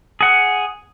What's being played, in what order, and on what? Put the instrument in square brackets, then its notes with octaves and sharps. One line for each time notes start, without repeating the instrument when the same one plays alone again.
[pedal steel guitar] G#4 F#5